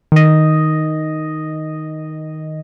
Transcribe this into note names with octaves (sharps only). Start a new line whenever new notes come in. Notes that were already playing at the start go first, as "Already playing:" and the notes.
D#3 D#5